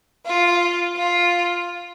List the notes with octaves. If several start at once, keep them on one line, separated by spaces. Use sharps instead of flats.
F4
F4